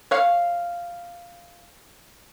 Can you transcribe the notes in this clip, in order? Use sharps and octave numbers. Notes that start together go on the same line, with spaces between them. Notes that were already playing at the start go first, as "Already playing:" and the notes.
C#5 F5